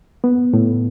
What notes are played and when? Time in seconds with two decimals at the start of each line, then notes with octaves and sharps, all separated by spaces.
0.24 B3
0.53 A2